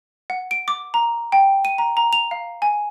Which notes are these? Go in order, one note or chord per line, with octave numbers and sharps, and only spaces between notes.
F#5
D7
D6
A#5
G5
D#7
A#5
A#5
F7
F5
G#5